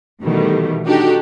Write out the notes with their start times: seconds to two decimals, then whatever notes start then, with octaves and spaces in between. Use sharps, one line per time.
0.21 B2 D#3 E3 G3 A3
0.86 D4 D#4 F#4 G4 A4